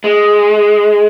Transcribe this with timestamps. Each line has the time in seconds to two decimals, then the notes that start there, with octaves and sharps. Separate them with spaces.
0.04 G#3